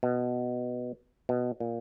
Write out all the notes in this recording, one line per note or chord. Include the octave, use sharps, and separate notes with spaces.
B2
B2
A#2